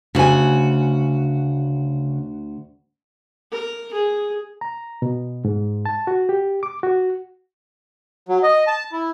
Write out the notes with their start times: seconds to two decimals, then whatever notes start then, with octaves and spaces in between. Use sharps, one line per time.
0.15 D2 C#3 F#4 G#5
3.51 A#4
3.93 G#4
4.61 A#5
5.02 B2
5.45 G#2
5.85 A5
6.07 F#4
6.29 G4
6.63 D6
6.83 F#4
8.29 F#3
8.43 D#5
8.67 A5
8.92 E4